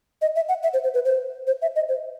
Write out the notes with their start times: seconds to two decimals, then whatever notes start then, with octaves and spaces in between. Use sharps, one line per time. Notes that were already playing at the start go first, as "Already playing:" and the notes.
0.22 D#5
0.36 E5
0.49 F#5
0.63 E5
0.73 C5
0.84 C5
0.94 B4
1.05 C5
1.47 C5
1.62 E5
1.76 D#5
1.89 C5